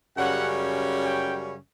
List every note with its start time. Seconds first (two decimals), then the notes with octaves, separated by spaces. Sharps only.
0.17 F#2 C#3 G3 C#4 F#5
1.04 G5